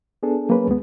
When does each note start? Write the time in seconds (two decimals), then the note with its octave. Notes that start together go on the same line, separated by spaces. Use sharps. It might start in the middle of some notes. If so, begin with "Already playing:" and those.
0.23 B3 D4 G#4 A4
0.49 F#3 A#3 C#4 G#4 B4 C#5
0.67 D#2 G#3 B3